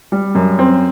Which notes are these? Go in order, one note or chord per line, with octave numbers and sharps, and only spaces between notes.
G3
F#2
C4